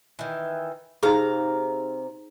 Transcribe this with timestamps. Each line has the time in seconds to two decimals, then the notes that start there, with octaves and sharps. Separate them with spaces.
0.19 D#3 E3
1.03 C3 D#4 G#4 F5 A#5